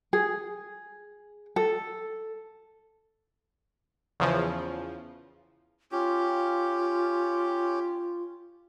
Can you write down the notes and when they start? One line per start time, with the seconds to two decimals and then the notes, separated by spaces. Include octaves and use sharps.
0.13 G#4
1.56 A4
4.20 E2 C#3 F3
5.92 C#4 F4 G4